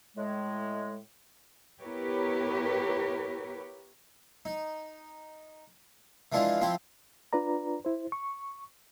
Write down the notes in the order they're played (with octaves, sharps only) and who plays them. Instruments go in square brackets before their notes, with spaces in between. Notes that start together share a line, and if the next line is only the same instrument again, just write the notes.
[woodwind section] A2 G#3
[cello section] B3 E4 G4 A#4 B4 C#5
[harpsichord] D#4
E3 F3 G#3 D4 E4 F4
F3 C4 E4 G5
[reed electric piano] D4 F4 B4 D5 A#5
E4 C5
C#6